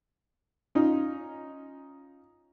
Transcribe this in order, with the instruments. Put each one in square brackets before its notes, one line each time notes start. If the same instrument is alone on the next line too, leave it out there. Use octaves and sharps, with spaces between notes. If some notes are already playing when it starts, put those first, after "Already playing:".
[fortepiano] C#4 D#4 F4